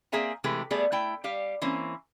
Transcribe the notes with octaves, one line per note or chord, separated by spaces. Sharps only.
A#3 C4 G#4 E5 G#5 A#5
C3 E3 G#3 A3 G4 B4
G3 A3 B3 G#4 D5
A3 E4 G5
G3 G4 F5
E3 A#3 C4 C#4